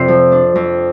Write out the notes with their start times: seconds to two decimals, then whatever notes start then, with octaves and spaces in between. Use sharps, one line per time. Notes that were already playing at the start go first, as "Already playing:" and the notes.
Already playing: F2 C3 C5 D5
0.08 F3
0.32 D4
0.56 F2